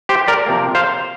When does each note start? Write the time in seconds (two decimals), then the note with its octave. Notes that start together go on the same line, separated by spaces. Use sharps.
0.09 G4 C5
0.28 A#4 D5
0.46 C3 F3 A#3
0.75 C5 F5